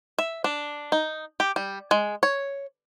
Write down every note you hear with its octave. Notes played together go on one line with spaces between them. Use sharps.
E5
D4
D#4
G4
G3
G#3
C#5